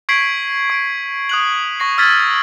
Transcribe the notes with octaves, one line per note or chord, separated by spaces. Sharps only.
C#6 G#6 B6 C7 D7 F#7
C#6 D7
D#6 F#6 F#7
C#6 A#6 C7
E6 F6 G#6 A6 B6